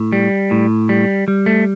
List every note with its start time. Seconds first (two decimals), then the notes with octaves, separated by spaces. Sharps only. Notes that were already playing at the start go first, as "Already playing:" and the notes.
Already playing: A2
0.13 G3
0.51 A2
0.89 G3
1.28 G3
1.46 A3